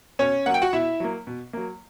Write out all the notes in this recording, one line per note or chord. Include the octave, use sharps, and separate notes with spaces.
B2 C#4 C#5
F#3 A#3 F#5
G5
F#4 F#5
B2 E4 E5
F#3 A#3
B2
F#3 A#3